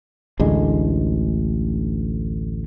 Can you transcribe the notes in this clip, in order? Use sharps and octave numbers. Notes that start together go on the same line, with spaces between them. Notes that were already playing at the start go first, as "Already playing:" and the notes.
A1 D2 D3 G#3